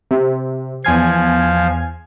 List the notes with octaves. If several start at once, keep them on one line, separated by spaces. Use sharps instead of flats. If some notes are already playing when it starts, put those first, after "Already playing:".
C3
E2 F3 F5 G#5 G#6